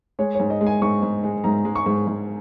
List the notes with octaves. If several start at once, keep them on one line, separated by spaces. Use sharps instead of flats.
G#3 C#5
G#2 C#5
D#5
G#3
G#5
G#2 C#6
G#2
G#3
G#2 A#5
G#3
C#6
G#2
G#2